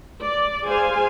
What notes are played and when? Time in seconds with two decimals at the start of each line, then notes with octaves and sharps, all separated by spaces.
0.23 D5
0.67 G#4 C5 F5 G#5